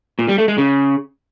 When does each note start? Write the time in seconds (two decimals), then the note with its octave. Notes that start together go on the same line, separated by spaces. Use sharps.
0.19 A#2
0.28 G3
0.38 A3
0.48 G#3
0.58 C#3